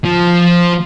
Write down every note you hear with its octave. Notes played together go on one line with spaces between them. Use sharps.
F3